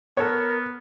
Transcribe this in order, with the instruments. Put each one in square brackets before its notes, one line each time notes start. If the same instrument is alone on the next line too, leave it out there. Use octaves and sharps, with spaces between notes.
[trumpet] B3 [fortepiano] A4 C#5 [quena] A#4